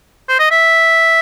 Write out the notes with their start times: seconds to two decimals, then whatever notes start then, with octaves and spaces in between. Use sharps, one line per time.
0.28 C5
0.39 D#5
0.51 E5